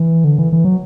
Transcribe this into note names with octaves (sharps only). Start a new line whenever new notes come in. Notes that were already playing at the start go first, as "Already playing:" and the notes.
Already playing: E3
D3
E3
E3
F#3